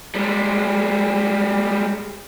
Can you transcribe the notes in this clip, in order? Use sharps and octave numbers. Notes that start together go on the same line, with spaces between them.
G3 G#3